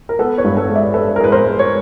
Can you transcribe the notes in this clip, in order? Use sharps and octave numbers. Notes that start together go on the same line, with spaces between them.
A#4
B3 A4 B4
B4 C#5
G2
A4 B4
G#3
D5 E5
G#3 A4 B4
A#4
G#3 B4
A#4 C5
G#3
C#5